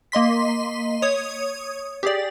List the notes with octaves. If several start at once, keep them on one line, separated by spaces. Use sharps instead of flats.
A#3 D#5 C6 B6
C#5 D#6 G#6
G4 G#4 D5